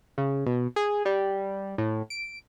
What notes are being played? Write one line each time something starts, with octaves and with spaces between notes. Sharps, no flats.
C#3
B2
G#4
G3
A2
D7